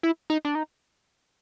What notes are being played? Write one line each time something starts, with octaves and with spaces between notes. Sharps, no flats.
E4
D#4
D4
D#4